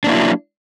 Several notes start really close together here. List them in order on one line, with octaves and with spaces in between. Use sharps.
D4 A#3 E4 F#3